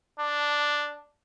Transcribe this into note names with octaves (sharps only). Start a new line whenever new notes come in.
D4